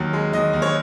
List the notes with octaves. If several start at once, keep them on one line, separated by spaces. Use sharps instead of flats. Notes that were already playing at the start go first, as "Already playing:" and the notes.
Already playing: D#2 F#3
G#3
D#2 D#5
D#2
C#5